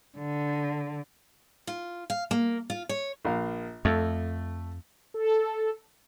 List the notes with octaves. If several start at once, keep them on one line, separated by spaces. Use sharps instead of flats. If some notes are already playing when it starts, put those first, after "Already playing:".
D3
F4
F5
A#3
F4
C#5
A#1 F5
F2 A3
A4